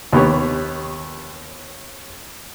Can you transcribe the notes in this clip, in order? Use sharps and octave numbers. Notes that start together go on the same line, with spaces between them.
D#2 B3 G4 C#5